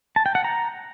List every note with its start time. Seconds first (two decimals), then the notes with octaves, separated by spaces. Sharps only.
0.16 A5
0.26 G5
0.35 F#5
0.44 A#5